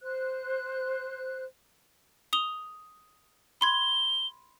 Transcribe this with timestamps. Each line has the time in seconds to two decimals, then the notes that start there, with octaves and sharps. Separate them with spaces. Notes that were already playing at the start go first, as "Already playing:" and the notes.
0.01 C5 F#6
2.33 D#6 F7 G7
3.61 B5 C6 G#6 G7